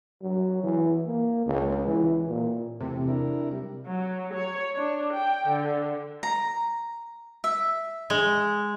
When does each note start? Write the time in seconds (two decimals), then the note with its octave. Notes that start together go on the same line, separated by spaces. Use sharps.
0.22 F#3
0.64 E3
1.06 A#3
1.46 C#2
1.88 E3
2.28 A#2
2.80 E2 C3 A3
3.08 D4 E4 A#4
3.52 G3
3.86 F#3
4.32 C#5
4.75 D4
5.13 G5
5.47 D3
6.23 A#5
7.44 E5
8.10 G#3